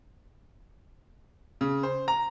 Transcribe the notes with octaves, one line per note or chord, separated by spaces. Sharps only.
C#3
C5
A#5